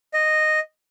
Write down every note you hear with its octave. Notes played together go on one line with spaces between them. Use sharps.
D#5